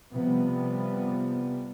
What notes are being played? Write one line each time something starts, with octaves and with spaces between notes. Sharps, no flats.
C3 F3 G3 B3